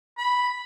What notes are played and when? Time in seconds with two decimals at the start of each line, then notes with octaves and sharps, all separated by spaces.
0.18 B5